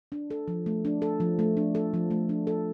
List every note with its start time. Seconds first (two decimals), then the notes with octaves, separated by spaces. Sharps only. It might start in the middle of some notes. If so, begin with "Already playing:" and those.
0.12 D4
0.30 A4
0.48 F3
0.66 A3
0.85 D4
1.02 A4
1.20 F3
1.39 A3
1.57 D4
1.75 A4
1.94 F3
2.11 A3
2.29 D4
2.47 A4